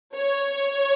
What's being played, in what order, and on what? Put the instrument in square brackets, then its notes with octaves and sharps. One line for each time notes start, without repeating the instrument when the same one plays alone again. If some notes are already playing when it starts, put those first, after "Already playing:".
[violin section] C#5